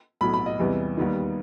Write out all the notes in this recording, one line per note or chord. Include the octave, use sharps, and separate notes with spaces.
B1 A2 F#3 B5
B5
D#5
E2 C3 E3 G3
D#2 D#3 G3 B3 D#4